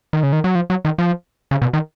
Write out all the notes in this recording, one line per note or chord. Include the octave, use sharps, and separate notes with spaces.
D#3
C#3
D#3
F#3
F3
F#3
D#3
F3
C#3
B2
D#3